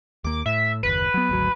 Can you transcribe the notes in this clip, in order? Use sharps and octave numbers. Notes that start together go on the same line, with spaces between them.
D#2 A#3 D6
A2 E5
F#1 D#2 B4
F#3 B3
G#1 D2 F#3